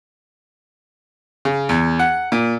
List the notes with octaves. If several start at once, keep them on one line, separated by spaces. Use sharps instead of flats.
C#3
E2
F#5
A#2